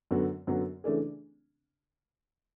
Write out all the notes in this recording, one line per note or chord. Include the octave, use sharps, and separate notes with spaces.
F#2 D3 F#3 B3 F#4
F#2 D3 F#3 B3 F#4
C#3 E3 A3 D4 G#4